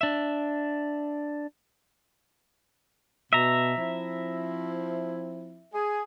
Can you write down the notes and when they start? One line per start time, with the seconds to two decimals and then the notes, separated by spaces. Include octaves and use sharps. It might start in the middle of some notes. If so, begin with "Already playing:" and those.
0.01 D4 E5
3.33 B2 E5 A#5
3.78 F3 C4 E4
5.73 G#4